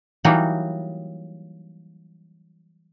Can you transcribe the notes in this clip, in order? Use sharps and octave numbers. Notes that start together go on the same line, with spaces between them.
E3 F#3 G3 A#3 D#4 F#4